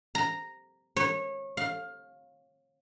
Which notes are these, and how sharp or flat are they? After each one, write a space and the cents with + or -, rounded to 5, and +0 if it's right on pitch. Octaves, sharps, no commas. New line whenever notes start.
A#5 -5
C#5 -25
F5 +15